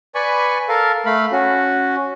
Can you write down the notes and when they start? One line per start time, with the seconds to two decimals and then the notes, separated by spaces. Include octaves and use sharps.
0.15 B4 D5 G#5 B5 C#6
0.69 A4 A#4 F5
1.06 A3 F5 B5
1.32 C#4 F#4